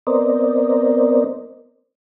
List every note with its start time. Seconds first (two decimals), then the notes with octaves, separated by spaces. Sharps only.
0.07 B3 C4 A#4 C5 D5 D#5